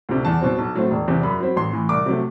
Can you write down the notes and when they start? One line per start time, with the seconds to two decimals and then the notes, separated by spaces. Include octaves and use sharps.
0.09 D2 C3
0.25 E2 A5
0.41 B2 F#3 C4
0.58 B1
0.75 A2 F#3 A3 C4
0.91 E1
1.08 E2 C3
1.23 F#2 B5
1.40 F#3 C4
1.56 A1 C6
1.73 A2 E3
1.89 C2 D6
2.06 C3 F#3 A3